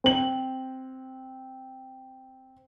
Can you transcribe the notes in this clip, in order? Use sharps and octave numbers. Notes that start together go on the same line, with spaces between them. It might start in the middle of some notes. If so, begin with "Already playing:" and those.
C4 F#7